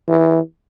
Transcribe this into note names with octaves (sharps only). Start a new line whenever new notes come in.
E3